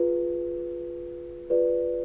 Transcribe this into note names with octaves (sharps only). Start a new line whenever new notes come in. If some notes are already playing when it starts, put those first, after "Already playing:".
Already playing: F4 G#4 B4
F4 G#4 B4 D5